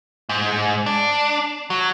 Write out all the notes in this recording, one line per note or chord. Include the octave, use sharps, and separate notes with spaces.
G#2
D4
F#3